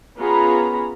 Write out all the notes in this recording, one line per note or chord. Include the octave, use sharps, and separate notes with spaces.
B3 C#4 F4 G#4 A#5 B5